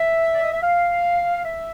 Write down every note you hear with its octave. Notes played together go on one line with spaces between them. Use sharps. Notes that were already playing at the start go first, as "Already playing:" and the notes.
Already playing: E5
D5
D#5
E5
F5
E5